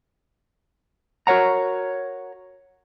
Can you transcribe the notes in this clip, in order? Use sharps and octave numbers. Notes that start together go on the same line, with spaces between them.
F#4 A#4 C#5 F#5 A#5